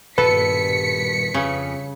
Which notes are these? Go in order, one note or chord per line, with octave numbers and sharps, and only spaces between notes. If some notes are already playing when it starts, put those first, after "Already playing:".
D#1 G2 B2 A4 B4 B6 C#7
F2 C#3